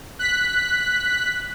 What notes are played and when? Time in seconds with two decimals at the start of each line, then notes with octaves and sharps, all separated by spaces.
0.19 F#6 B6